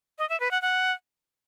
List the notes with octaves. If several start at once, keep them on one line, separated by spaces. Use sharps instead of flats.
D#5
E5
B4
F#5
F#5